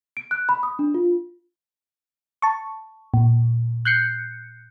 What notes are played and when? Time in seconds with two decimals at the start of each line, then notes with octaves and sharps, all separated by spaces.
0.17 D7
0.31 F#6
0.49 B5
0.63 D#6
0.79 D4
0.94 F4
2.42 A5 C#6
3.14 A#2
3.85 F#6 G6 C7 C#7